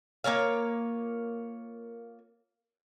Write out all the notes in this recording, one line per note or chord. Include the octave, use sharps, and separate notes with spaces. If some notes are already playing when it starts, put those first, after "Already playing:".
A#3 F4 C#5 F5